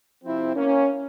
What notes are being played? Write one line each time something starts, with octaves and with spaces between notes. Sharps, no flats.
C3 F3 C4 E4
A#3 C#4